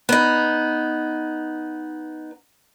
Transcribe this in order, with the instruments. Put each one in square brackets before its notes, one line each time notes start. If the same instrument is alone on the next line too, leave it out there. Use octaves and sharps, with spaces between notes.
[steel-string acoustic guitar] B3 D#4